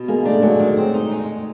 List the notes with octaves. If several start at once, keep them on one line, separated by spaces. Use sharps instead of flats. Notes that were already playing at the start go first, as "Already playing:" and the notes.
Already playing: B2
G#3 A#3 G#4
A3 D4 A4
F#3 G#3 G#4
D#3
C4
D#4
G#3